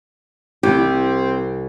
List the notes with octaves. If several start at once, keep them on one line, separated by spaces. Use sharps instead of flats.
C2 C4 G4